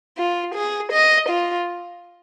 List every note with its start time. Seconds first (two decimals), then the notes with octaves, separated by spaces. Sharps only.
0.18 F4
0.55 G#4
0.92 D#5
1.29 F4